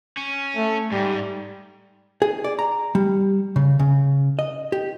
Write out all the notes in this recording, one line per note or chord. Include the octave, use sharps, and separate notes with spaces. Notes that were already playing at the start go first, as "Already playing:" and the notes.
C#4
A3
G#2 G3
G#4
D5
A#5
G3
C#3
C#3
D#5
G4